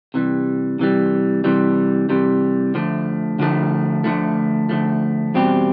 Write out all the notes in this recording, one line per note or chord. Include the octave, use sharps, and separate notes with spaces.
C3 E3 G3
C3 E3 G3
C3 E3 G3
C3 E3 G3
D2 D3 F3 A3
D2 D3 F3 A3
D2 D3 F3 A3
D2 D3 F3 A3
E2 B2 G3 C4 G4